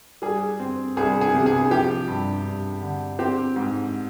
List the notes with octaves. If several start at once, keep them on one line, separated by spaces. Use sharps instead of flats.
G3 G#4
C4
C2 G#4
G#4
C3
G#4
F3 G4
G2
G2
D3
C4 G4
G#2